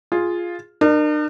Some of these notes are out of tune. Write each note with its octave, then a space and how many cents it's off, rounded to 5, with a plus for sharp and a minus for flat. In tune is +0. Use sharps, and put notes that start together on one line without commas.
F4 +0 G#4 +0
D4 +45 A#4 +0